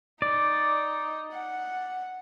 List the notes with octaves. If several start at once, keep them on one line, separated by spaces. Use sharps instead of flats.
D#4 D5
F#5